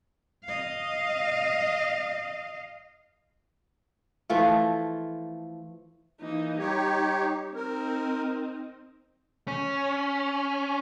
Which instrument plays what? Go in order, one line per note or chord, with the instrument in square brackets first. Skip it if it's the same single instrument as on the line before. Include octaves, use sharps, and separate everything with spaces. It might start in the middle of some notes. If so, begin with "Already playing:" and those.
[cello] D#5 F5
[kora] E3 F3 A3 F4
[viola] E3 D#4 [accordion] A#3
[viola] G3 [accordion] D#4 G4 C#5
[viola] C4 D#4 [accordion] A#4
[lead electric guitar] C#4